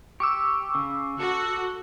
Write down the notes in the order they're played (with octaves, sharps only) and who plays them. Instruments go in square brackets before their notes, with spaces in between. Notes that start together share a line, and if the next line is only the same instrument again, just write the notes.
[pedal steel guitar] G4 [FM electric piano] C#6 D6 E6
[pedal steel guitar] C#3
[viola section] F#4 [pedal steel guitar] A4